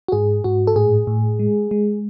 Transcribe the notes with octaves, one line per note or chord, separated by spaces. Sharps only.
F#4
G#2 G#4
G#2 F#4
A4
A2 G#4
A2
G#3
G#3